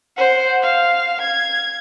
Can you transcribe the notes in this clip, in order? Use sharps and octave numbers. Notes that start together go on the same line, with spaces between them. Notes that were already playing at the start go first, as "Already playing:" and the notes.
C5 F#5
F5
G#6